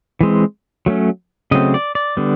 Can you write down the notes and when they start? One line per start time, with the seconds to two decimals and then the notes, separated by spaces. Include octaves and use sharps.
0.21 E3 G#3 C4
0.86 F#3 A3 C#4
1.51 C#3 F#3 A3 C4 D#5
1.74 D5
1.95 D5
2.17 D3 G3 B3